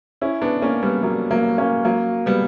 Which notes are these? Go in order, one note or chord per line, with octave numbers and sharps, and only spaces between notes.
C#4 E4
B3 D4
A#3 C#4
G3 B3
F#3 A#3
F#3 A#3
A#3 C#4
F#3 A#3
G3 B3